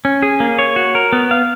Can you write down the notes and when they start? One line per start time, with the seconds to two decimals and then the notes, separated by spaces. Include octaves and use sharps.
0.05 C#4
0.23 G#4
0.40 A#3
0.59 C#5
0.76 F#4
0.95 A#4
1.13 B3
1.31 F5